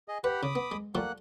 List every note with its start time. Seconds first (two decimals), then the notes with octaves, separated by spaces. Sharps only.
0.08 G#4 D#5
0.24 G4 B4 F#5 B5
0.43 C#3 B5 D6 D#6
0.55 B3
0.72 G#3
0.95 F3 G3 A3 A#3 F#5 F#6